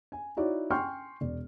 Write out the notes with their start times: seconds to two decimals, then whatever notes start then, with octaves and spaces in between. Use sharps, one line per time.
0.12 G#5
0.37 D#4 E4 F#4 C#5 D5
0.71 G5 G#5 C6 C#6 F6 G6
1.21 E1 D5